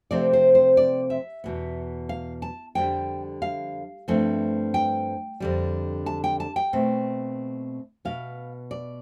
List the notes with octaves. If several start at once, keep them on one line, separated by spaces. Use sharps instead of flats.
C3 F3 A3 C4 D5
C5
C5
D5
E5
E2 B2 B3
F5
A5
F2 D3 G3 G5
F5
G2 F3 A3 C4
G5
F2 D3 G3
A5
G5
A5
G5
B2 A3 C4
B2 B3 F5
D5